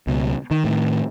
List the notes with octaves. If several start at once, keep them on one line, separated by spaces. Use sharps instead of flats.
C#2 B2
D#3
A2 D#3